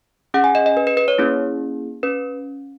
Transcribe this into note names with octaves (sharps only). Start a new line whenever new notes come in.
C#4 G#4 F#5
G#5
D#5
D#5
B4
B4
B4
C#5
A#3 C#4 E4 G#4
C#4 B4